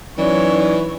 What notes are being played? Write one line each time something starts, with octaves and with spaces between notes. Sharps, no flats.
F#2 E3 D#4 C#5 D5